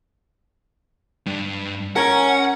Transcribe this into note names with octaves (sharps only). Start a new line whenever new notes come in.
G2
C#4 A#4 F#5